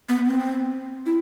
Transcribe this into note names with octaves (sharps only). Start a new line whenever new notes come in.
B3
C4
E4